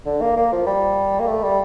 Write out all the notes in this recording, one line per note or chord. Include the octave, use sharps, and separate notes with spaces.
D3
A#3
A#3
F3
G3
A#3
A3
G3